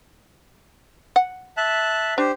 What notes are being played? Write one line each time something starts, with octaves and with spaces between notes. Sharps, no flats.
F#5
E5 A5 F#6
D4 G4 C5